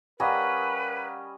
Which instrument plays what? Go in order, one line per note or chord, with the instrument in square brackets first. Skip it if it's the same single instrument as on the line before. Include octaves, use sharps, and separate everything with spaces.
[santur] G3 C#4 D#5 [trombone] A#4 [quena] B4 [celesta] F5 F#5 A#5